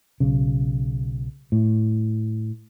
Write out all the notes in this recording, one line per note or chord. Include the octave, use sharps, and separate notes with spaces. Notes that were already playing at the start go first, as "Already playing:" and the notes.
B1 C#3
A2